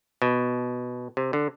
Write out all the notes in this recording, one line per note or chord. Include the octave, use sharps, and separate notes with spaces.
B2
C3
D3